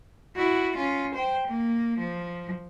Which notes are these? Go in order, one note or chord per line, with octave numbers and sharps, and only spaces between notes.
E4 F#4
C#4 F4
C5 G5
A#3
F3